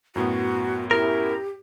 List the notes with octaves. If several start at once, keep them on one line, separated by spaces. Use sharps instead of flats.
F#2 A2 B3 F#4
C#4 E4 G4 A#4